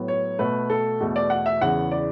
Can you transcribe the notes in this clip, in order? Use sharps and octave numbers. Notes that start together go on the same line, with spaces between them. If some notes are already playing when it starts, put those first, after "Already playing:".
Already playing: A2 F#3 B3
C#5
B2 A3 B4
A4
E2 B2 A3
D5
F#5
E5
E2 C#3 E3 F#5
D5